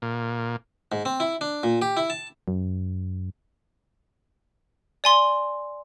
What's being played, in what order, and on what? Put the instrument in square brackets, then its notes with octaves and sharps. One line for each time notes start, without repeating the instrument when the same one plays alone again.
[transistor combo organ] A#2
[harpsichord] G#2
C4
E4
D4
A#2
G4
E4
A5
[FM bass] F#2
[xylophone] D5 G#5 C6